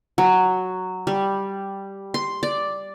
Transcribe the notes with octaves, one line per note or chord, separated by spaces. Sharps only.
F#3
G3
C6
D5